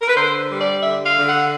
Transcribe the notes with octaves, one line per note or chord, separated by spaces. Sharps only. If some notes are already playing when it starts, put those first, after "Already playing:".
A#4
B4
D3 C5
G3
D5
D3 E5
F5
D3
F#5